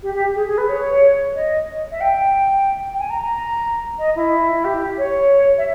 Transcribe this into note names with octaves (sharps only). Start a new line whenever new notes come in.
G4
G4
G#4
G#4
B4
C#5
D#5
E5
G5
G5
G#5
A#5
A#5
D#5
E4
E4
G4
C#5
E5